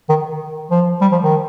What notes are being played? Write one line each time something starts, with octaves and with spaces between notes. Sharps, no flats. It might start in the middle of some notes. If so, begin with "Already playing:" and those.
D#3
F3
G3
F3
D#3